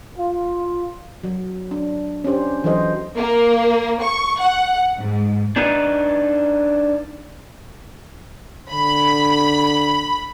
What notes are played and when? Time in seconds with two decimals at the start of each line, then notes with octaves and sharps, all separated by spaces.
0.18 F4
1.24 F#3
1.71 D4
2.24 C#4 D4 G4 C5
2.64 E3 F#3 A4 C5 D#5
3.16 A#3
4.01 C#6
4.39 F#5
4.97 G#2
5.56 D4 D#4 B4
8.72 D3 B5